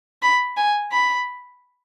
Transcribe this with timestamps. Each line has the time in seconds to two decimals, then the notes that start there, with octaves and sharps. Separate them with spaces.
0.22 B5
0.57 G#5
0.92 B5